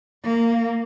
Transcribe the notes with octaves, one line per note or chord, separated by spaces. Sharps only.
A#3